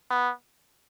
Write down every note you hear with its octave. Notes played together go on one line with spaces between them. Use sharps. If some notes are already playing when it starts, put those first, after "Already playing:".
B3